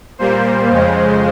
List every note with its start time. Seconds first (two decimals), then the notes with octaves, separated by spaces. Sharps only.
0.19 A#2 G3 A#3 C5
0.69 F2 C#3 G#3